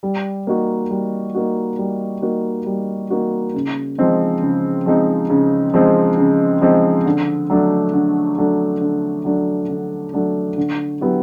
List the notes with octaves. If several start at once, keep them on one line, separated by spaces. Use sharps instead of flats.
G3
A#3 D#4 F#4
G3
A#3 D#4 F#4
G3
A#3 D#4 F#4
G3
A#3 D#4 F#4
C#3
F3 G#3 C4 D#4
C#3
F3 G#3 C4 D#4
C#3
F3 G#3 C4 D#4
C#3
F3 G#3 C4 D#4
D3
F#3 A3 D4
D3
F#3 A3 D4
D3
F#3 A3 D4
D3
F#3 A3 D4
D3
F#3 B3 E4 G4